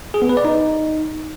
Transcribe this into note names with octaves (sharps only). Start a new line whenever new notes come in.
G#4
B3
B4
D5
D#4